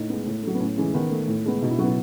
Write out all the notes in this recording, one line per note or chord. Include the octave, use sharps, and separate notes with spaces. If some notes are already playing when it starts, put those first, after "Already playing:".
Already playing: A2 D#4
G#3 B3
A2
F#3 A3
B3
A2 C#4
E3 G#3 C#4
D#3 B3
A3
A2
G#3 B3
B2 D#4
E4
F#3 F#4
B3 E4